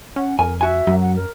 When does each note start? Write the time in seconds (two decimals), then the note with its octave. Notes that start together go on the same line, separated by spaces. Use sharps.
0.16 C#4 F#5
0.39 F2 A#4 G#5
0.61 F#4 E5 G#5
0.87 F#2 F#3
1.01 F#5
1.16 A#4